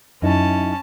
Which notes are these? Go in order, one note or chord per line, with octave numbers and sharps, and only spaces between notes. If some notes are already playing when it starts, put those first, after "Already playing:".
F#2 C#4 D#4 E4 A5